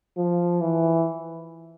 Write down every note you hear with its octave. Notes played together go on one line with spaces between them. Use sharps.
F3
E3